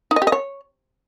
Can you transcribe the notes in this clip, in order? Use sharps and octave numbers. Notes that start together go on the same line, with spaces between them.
D#4
D#5
G4
D#5
C#5